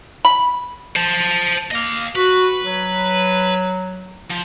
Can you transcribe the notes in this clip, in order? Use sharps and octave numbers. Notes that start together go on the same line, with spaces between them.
B5
C5 A5
A#3 D#5 F5
F#4 B4
F#3
F3